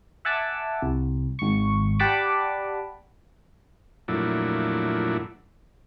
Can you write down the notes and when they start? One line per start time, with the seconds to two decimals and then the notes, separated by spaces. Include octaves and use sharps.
0.25 E5 F#5 G#5 A5 D6 E6
0.82 C2
1.39 G#1 C#6
1.99 G4 D5 F#5 A5 B5 D6
4.08 F2 A#2 F#3 A3 D4 E4